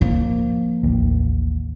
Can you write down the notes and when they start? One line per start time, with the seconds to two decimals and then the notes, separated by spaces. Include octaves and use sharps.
0.01 F3 A#3
0.83 A1 D#2